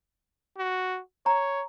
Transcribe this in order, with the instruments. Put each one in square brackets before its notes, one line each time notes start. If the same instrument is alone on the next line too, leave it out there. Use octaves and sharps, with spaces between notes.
[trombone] F#4
[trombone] C#5 [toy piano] A#5